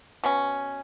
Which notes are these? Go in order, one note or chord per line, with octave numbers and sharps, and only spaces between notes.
B2 C#4